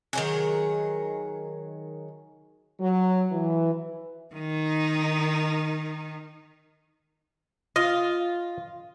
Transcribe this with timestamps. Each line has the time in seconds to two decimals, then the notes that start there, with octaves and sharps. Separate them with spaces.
0.13 D#3 F#3 G#4
2.80 F#3
3.31 E3
4.35 D#3 D#4
7.76 F4 D#5